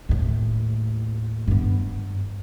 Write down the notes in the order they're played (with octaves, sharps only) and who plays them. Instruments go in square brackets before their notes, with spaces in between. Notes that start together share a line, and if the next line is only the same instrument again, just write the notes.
[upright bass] D#2 A2
G2 B3